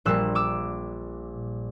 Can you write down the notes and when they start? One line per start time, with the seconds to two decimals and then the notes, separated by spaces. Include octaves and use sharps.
0.05 A#1 A#2 G3 A#3 E6 F#6
0.35 D6 E6